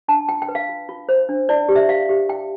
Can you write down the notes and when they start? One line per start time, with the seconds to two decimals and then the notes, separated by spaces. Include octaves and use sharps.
0.08 D4 A5
0.29 F4 G5
0.42 G5
0.48 B4
0.55 F5
0.69 F4
0.89 F4
1.09 C5
1.29 D4
1.49 E4 D5
1.69 G4
1.76 E5
1.89 G4 F5
2.09 G4
2.29 E4 G5